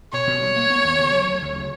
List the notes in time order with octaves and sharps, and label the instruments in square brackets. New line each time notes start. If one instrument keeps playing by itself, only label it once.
[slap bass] B2 [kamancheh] C#5
[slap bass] B2
G3
A#3
B3
D#2
C#3
F#3
D2
D2
C#3